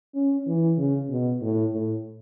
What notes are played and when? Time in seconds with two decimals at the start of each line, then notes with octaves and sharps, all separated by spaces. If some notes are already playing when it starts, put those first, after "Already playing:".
0.15 C#4
0.47 E3
0.78 C#3
1.10 B2
1.42 A2
1.73 A2